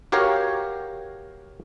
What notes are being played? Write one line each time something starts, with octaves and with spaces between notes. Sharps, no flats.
F#4 G4 A#4 C#5 F5